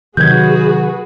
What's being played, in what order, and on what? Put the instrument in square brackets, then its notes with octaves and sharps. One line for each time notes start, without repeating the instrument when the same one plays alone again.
[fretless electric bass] C3 D#3 F#3 [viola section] F#4 G#4 B4 [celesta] G6 G#6